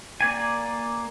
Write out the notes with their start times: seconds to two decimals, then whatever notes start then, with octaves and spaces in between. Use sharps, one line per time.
0.21 A#3 D5 G#5